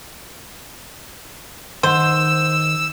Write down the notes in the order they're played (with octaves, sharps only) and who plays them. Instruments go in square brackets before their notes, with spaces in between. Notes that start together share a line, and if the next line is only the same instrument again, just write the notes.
[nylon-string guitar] D#3 F#5 [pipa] C5 [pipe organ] E6